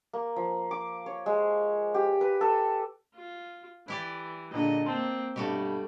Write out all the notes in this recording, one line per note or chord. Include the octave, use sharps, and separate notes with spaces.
A#3
F3
D6
C#5
G#3
G4
B4
A4
F4
E3 E4 G4 D5
A#2 D3 G#3 D#5
A#3 C4 A5 C6
G2 B2 G3 A3 F#4 G4